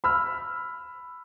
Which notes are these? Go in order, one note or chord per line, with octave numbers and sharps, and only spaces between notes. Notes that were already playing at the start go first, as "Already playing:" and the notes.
B5 E6 F6